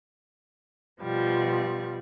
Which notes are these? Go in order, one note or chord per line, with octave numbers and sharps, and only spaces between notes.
B2 F3 G3